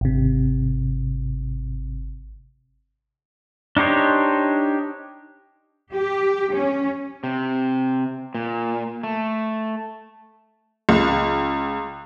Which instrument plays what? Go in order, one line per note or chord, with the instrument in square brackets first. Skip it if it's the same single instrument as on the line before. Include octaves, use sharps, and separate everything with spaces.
[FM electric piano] G#1 C3
[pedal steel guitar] D4 D#4 G4 C5 C#5
[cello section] G4
C#4
[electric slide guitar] C3
A#2
A3
[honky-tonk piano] C#2